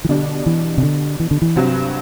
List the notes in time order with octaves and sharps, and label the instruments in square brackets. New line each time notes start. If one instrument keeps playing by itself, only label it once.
[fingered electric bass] E3
[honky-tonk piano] B2 G3 D4 [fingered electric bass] D3
[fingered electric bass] E3
C3
D3
E3
D3
E3
[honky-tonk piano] G2 F#3 C4 [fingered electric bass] C3